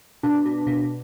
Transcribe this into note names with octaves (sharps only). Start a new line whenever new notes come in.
B2 D4
B2
B2